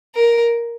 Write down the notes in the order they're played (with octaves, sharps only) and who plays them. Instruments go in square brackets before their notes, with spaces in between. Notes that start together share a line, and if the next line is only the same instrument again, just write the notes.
[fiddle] A#4